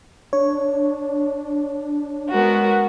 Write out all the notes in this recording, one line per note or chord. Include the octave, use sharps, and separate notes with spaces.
D4 C#5
G#3 B3 F#4 A#4